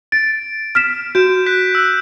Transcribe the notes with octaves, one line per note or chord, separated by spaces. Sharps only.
A6 D7
F6 B6 E7
F#4 G6 D7 E7
F#6 G6 B6
E6 F#6